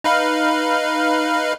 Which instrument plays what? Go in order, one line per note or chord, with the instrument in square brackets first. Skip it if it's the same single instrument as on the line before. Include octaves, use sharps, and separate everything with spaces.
[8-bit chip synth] D#4 B4 F5